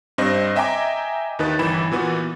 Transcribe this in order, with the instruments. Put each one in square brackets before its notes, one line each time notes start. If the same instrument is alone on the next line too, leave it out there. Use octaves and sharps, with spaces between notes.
[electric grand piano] G2 C4 D#5 A#6
D#5 E5 G5 G#5 A#5 D6
D#2 D#3 D#4 B4 A6
G1 E3 B5 E7
A#2 E3 B3 F#4